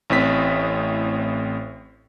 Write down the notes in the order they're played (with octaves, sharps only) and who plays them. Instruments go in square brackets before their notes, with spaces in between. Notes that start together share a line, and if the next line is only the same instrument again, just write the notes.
[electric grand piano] A1 A2 C4 B6